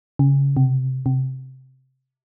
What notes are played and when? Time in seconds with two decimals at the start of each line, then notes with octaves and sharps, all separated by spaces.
0.19 C#3
0.57 C3
1.06 C3